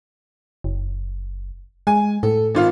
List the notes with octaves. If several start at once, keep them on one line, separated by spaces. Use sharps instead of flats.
F#1
G#3 G#5
A2 A4
G#1 F4 F5